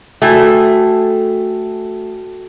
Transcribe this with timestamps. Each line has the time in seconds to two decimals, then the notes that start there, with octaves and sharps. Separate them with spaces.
0.22 A3 F#4 G5 G#5